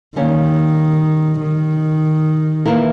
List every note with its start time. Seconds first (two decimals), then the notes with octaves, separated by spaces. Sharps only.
0.16 D#3 G3 A#3 C#4
1.41 D#3
2.66 E3 A#3 E4 A#4